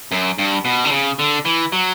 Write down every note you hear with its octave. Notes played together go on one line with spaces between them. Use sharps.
F#2
G2
B2
D3
C#3
D3
E3
F#3